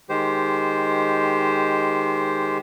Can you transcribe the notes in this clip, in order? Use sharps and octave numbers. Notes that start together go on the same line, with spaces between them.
D#3 G#3 G4 C5